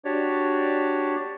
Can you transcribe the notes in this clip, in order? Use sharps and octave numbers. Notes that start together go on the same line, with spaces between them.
D4 F#4 G4 C#5 D5